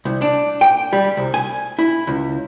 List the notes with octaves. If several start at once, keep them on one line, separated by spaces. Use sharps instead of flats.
C2
D4
G5
G3
C2
G#5
E4
C#2